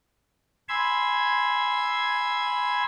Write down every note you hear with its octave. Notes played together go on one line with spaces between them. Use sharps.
G#5 B5 C6 E6 G#6